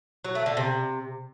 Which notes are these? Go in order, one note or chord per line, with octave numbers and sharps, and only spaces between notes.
F#3
A3
D3
C3